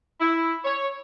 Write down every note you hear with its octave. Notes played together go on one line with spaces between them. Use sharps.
E4
C#5